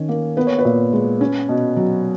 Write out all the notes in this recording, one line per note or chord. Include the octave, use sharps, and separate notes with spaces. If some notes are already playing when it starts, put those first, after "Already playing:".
Already playing: D#3 C#4
A#3
B3 B4
C#5
B4
A#2
G#3
C#4
B2
F#3